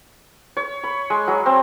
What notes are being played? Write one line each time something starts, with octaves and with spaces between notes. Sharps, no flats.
C#5
B5
G#3
F#3
C4